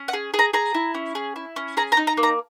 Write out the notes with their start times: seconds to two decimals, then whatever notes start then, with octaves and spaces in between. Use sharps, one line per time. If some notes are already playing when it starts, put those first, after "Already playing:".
Already playing: C#4
0.08 F#5
0.13 G#4
0.34 G#4
0.39 A#5
0.53 G#4 A#5
0.74 E4
0.95 C#4
1.15 G#4
1.36 E4
1.56 C#4
1.77 G#4 A#5
1.92 A#5
1.97 D#4
2.07 A#5
2.17 A#3
2.23 A#5